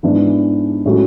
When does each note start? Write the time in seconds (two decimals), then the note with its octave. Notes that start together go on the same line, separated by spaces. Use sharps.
0.03 G#2 E3 G#3 B3 D4
0.86 A2 G#3 C#4 F#4